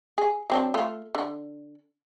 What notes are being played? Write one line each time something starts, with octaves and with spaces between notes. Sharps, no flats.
G#4
F#3 C4 D4
A3 F4
D3